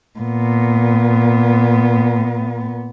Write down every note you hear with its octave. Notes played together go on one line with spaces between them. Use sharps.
A#2 B3